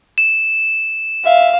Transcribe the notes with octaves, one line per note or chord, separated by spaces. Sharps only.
E7
E5 F5